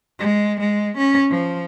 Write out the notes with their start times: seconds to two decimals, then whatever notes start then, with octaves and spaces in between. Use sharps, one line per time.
0.19 G#3
0.60 G#3
0.98 C#4
1.30 F3